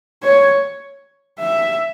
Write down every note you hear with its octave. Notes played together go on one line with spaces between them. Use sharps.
C#5
E5